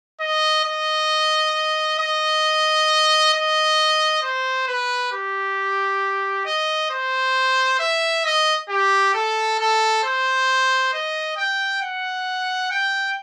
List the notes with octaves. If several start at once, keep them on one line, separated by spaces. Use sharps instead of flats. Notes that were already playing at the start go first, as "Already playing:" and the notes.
D#5
D#5
D#5
D#5
C5
B4
G4
D#5
C5
E5
D#5
G4
A4
A4
C5
D#5
G5
F#5
G5